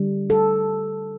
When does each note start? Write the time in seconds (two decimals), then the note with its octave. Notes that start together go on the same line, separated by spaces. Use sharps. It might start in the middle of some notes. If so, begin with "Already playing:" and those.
Already playing: D3 G3
0.30 A4